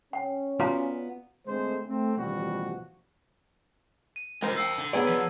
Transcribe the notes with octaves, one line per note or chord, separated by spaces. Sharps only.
C#4 G5
B3 F4 F#4 D5 F5 A#5
D3 G#3 A3 C4 C5
A3 C4
A1 D#2 B2 F3 G3 F#4
D#7
D3 G#3 A#4 C5
F5 G5 E6
D3
F#3 B3 G#4 D5
F3